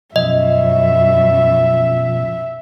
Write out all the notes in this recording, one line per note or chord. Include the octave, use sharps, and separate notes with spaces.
F#2 B2 F3 D#5 E5